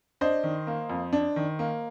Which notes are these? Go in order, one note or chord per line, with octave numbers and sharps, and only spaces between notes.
D4 C5 D#5
D#3
A#3
F2
D4
D#3
A#3